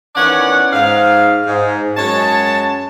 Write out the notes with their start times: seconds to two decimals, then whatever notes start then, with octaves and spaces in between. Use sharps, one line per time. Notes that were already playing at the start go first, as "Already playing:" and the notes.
0.16 D#3 E3 B3 C#4 D5 F#5
0.73 G#2 F5
1.47 G#2
1.97 F#2 G#3 F#4 C#5 A5